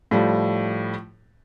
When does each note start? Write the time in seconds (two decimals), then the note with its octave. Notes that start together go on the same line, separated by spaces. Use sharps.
0.11 A2 F3 G3